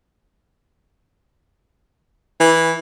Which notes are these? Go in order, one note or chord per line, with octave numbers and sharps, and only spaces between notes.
E3